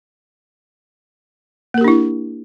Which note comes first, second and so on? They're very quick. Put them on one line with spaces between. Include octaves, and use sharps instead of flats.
A#3 A#4 G4 D4 E4